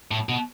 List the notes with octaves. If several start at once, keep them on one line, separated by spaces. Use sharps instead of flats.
A2
B2